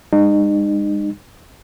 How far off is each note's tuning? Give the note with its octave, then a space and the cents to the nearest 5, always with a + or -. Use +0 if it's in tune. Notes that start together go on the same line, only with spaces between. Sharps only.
G#3 -40 D#4 -35